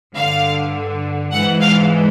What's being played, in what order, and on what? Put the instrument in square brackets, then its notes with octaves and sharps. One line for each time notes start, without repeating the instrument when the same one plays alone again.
[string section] G2 D3 F5
G#2 E3 F#5
F5